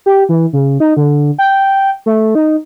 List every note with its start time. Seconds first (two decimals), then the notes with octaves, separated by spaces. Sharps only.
0.06 G4
0.29 E3
0.53 C#3
0.80 D#4
0.97 D3
1.39 G5
2.06 A3
2.35 D#4